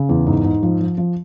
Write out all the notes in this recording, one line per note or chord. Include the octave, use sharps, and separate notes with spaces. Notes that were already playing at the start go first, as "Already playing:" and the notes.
Already playing: C#3
E2
G#2
G#2
F3
F3
F3